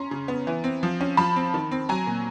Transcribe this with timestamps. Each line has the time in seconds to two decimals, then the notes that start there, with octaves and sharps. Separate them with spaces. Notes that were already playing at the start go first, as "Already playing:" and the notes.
Already playing: C#4 A#5 C6
0.11 C#3
0.28 B3
0.47 E3
0.64 C4
0.83 F3
1.01 C#4
1.17 F3 A5 B5
1.36 C4
1.54 D#3
1.71 C4
1.89 F#3 G#5 A#5
2.07 A#2